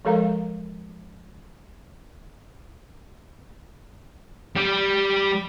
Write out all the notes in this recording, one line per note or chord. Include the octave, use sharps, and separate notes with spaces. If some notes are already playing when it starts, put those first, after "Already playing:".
F3 G#3 A4 A#4 F5 A#5
G3 G4